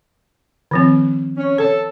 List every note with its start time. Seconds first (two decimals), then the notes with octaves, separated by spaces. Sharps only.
0.71 D#3 F3 C4
1.36 C#4
1.58 A4 C#5